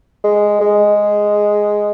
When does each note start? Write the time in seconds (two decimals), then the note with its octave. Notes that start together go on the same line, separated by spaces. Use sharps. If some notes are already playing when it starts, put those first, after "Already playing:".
0.24 G#3
0.61 G#3